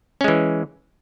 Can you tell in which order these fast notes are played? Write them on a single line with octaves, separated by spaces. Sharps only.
C#4 G#3 E3